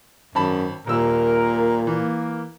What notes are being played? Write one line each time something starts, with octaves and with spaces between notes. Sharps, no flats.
G#1 F#2 A5 B5
D#1 A#2 A#4 E6
E3 A#3